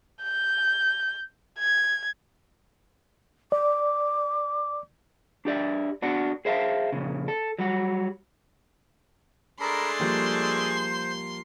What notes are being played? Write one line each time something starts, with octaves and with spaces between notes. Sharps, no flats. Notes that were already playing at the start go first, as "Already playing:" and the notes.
G6
G#6
D5 D6
D4 G4 D5 E5
B3 D4 F#4 F#5
G#4 C5 E5 F5 A5
F2 A#2 C#3
A4
F#3 G3 F#4
G#3 A3 D4 A#4 B5 C6
F3 G3 A#3 C5